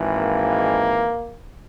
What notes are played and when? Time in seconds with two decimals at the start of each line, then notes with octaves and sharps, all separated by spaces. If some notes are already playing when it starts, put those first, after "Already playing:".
Already playing: G#1 G#2 E3
0.14 A#3